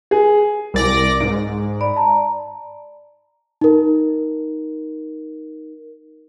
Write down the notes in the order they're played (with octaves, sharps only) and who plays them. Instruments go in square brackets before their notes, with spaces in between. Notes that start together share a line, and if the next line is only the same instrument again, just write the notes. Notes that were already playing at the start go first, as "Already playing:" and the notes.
[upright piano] G#4
[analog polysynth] C2 D5 A#6 [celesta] A#4
[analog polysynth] G#2 [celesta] D7
[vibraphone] D5 [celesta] B5
[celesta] A5 A#5
D#4 A#4